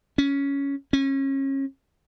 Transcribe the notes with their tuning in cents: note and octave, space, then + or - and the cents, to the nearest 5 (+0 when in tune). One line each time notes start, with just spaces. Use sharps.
C#4 +10
C#4 -30